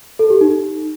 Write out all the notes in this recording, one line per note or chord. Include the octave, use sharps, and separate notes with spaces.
A4
G4
D#4